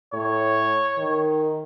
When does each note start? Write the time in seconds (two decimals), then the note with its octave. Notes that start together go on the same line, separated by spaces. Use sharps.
0.13 A2 C#5
0.98 D#3